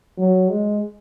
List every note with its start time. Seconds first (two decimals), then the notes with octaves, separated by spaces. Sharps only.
0.18 F#3
0.49 G#3